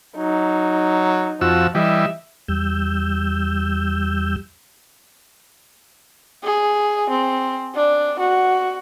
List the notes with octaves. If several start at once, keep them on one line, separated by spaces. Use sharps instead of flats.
F#3 D#4
F2 F3 F#4 E6
E3 G3 D#5 E5 E6
E2 G3 E6 G6
G#4
C4
D4
F#4